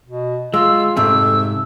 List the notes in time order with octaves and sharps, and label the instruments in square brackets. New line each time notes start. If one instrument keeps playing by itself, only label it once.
[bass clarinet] B2
[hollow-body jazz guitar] G#3 [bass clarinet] F4 [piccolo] E6
[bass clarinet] F2 [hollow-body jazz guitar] G#2 C3 A3 [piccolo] E6